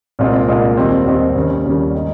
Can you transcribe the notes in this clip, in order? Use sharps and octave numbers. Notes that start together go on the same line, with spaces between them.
C2 A#2 G#3 C4 F4
C2 A#2 G#3 C4 F4
D#2 D#3 G3 C4
D#2 D#3 G3 C4
D#2 C#3 G3 C#4
D#2 C#3 G3 C#4
D#3 G#3 D#4